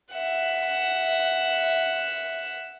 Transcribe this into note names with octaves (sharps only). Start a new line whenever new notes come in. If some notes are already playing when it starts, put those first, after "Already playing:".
E5 F#5